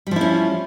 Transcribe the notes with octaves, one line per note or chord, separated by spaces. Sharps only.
F3 G3 C#4 E4